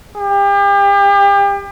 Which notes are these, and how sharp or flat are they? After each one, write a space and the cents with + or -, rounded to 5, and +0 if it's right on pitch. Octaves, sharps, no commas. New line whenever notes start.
G4 +35